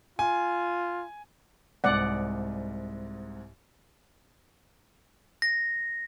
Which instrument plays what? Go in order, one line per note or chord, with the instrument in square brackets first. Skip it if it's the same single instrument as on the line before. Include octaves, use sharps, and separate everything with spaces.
[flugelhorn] F4 [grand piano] G#5
[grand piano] C2 G#2 [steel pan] D5 F#5
[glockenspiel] A#6